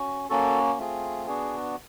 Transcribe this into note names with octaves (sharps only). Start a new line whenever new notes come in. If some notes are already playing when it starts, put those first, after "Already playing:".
Already playing: C#4 F#4
A#3 C#4 F#4 A4
A3 C4 F4 G#4
B3 D4 F#4 G#4